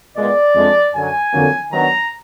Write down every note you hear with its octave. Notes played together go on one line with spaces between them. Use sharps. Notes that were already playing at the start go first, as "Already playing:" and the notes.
A#2 G#3 B3 D5
F2 F3 G#3 D4
F#2 D3 F#3 G#5
F2 D3 F#3 A#3
D#3 F#3 B3 D4 A#5